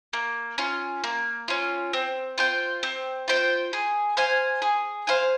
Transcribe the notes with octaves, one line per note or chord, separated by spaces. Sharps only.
A#3
C#4 F4
A#3
C#4 F4
C4
F4 C5 G5
C4
F4 C5 G5
G#4
C5 F5 G#5
G#4
C5 F5 G#5